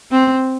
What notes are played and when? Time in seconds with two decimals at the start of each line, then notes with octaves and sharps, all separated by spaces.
0.11 C4